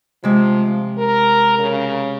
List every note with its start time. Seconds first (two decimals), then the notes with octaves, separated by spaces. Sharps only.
0.24 C3 F3 G#3
0.98 A#4
1.59 C#3